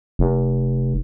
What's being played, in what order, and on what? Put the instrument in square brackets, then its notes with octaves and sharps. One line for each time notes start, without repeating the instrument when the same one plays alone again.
[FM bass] F1